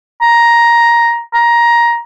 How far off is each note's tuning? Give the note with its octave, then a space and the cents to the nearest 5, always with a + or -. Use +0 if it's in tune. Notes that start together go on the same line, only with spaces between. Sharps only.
A#5 +10
A#5 +15